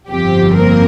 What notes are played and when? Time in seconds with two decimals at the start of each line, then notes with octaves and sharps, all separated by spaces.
0.11 G1 F2 F3 C4 G4
0.56 A#3 A#4